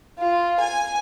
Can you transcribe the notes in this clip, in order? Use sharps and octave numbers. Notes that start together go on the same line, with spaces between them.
F4
G#5